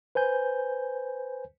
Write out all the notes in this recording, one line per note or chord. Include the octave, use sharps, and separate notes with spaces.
B4 C5 G#5 G6